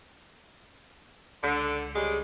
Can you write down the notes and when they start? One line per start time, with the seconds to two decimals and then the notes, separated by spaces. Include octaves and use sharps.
1.43 C#2 D3
1.95 C#3 G3 G#3